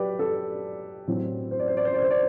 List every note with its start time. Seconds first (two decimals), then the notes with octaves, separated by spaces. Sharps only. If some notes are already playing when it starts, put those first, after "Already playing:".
Already playing: F#3 G4 B4 D5
0.19 A4
1.08 A2 F#3 C4
1.51 C5
1.59 D5
1.68 C5
1.77 D5
1.85 C5
1.94 D5
2.02 C5
2.10 D5